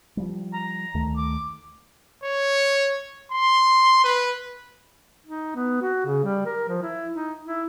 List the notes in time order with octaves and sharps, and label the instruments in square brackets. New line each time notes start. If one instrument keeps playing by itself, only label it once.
[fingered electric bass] F3 G3
[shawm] A#5
[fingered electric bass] D2 D#3 A3
[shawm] D6
[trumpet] C#5
C6
B4
[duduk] D#4
B3
F#4
C#3
G3
A#4
F3
E4
D#4
E4